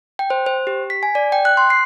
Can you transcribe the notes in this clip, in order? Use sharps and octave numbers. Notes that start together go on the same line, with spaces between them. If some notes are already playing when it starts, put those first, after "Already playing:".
G5
C5
C5
G4
B6
G#5
D5
G5
F#6
C6
C7